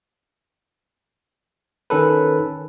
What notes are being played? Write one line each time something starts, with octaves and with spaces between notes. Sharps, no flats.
D#3 C#4 A4 B4